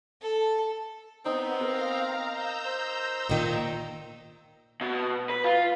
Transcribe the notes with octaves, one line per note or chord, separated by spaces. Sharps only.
A4
B3 C4 D#4
A#4 F5 A#5
A#5 E6 G6
C5
A#2 D#3 D#4
B2
B4
F4